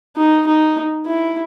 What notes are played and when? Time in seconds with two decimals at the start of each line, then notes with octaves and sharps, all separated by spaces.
0.17 D#4
0.47 D#4
1.06 E4